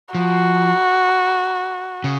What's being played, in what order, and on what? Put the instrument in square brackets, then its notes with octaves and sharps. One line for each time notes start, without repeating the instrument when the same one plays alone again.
[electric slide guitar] F3 [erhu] F#4
[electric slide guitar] C#3